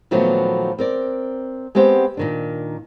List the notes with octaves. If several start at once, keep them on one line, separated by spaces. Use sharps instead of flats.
A#2 D#3 F3 F#3 A3 B3
C4 A#4 D5
G#3 B3 C4 G4 C5 F#5
A#2 D#3 D4